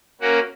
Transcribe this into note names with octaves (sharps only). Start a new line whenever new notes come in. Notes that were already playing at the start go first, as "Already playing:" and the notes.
A#3 C#4 F#4 A#4